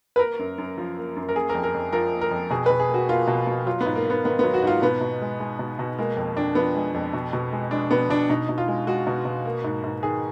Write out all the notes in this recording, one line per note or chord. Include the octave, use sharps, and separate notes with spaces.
B4
A#3 A#4
F#2
F#2
F3
A#3
F#2
A#4
A#3 G#4
A#4
F2
A#4
F2
F3 A#4
A#3
A#4
F2
B2 G#4
B2 B4
G#4
A#3
F#4
A#3 F4
B2
B2
F#3 F4
B3
G#2
A#3
A#3 B3
D#3 B3
F#3 B3
F#4
G#2 F4
B2 B3
B2
G#3
G#3
B2
B2
G#3 A#3
F2
F2 D4
F3 B3
G#3
F2
B2
B2
G#3
G#3 D4
B2 B3
B2 D4
B2 D#4
B2
F4
G#3
G#3 F#4
B2
B2
A#3
G#2
G#2
D#3 G#4